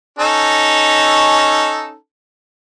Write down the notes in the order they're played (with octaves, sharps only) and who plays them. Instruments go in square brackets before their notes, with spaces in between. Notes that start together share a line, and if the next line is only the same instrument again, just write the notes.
[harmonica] C#4 D#4 A4